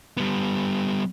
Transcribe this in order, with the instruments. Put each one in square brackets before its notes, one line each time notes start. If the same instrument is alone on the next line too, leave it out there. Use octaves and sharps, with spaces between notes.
[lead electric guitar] G3 B3